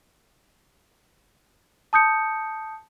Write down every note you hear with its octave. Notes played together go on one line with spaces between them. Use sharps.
A5 D#6 G6 C#7